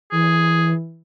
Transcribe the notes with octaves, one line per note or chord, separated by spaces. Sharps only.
E3 G#4